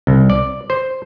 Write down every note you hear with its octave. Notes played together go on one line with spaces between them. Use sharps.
C2
D5
C5